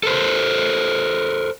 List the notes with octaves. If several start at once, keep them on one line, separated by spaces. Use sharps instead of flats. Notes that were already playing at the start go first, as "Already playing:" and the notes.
A4 A#4 C5